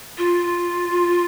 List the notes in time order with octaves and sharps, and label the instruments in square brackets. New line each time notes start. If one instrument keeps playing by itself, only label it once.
[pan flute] F4